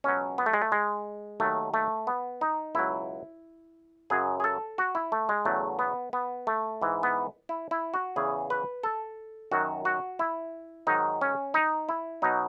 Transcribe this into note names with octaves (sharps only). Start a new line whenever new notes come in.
C#2 B2 F#3 C#4
B3
A3
G#3
A3
G#3
D#2 D#3 F#3 A3
A3
B3
D#4
C#2 B2 F#3 E4
F#2 C#3 F#3 G#4
G#4
A4
F#4
E4
A3
G#3
E2 C#3 F#3 A3
B3
B3
A3
G#2 E3
B3
E4
E4
F#4
E2 C#3 E3 G#4
B4
A4
F#2 D#3 F#3 F#4
F#4
E4
G#2 D#3 F#3 D#4
C#4
D#4
E4
B2 F#3 D#4